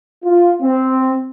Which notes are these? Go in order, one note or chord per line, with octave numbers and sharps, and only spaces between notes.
F4
C4